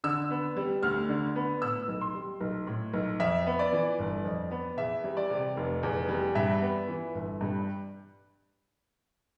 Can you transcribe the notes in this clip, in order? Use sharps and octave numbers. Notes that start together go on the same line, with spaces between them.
D3 E6
B3
G3
D2 F6
D3
B3
A2 E6
B1
C6
G3
B1
A2
B1
F2 E5
B3
D5
E3
G1
F2
B3
E2 E5
G3
D5
C3
F1
E2
G3
G2 E5
B3
E3
G1
G2